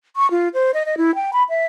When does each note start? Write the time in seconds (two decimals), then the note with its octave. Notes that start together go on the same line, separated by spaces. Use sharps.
0.16 C#6
0.31 F4
0.54 C5
0.74 D#5
0.86 D#5
0.98 E4
1.15 G5
1.33 B5
1.49 E5